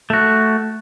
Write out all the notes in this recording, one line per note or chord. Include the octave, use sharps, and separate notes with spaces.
A3 F#4